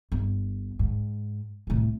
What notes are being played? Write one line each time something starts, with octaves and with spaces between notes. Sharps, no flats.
G1
G#2
C2 A2